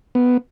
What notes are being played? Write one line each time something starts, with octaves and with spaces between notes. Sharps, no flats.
B3